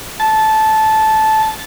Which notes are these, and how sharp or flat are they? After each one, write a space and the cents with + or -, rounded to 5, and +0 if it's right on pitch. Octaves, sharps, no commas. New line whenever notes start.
A5 -15